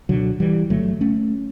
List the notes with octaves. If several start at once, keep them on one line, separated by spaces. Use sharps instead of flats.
C#2 B2 D3 F#3
E3 G3
G1 G2 D3 F#3 A3
A3 C#4